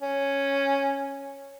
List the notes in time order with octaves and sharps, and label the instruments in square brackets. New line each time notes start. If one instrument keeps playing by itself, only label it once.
[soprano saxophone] C#4